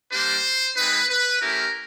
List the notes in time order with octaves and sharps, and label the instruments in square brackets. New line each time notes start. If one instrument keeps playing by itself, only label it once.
[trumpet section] G3 A#3 D4 G4 C5
G#3 C4 D#4 B4
B4
A3 C#4 E4 G4 A#4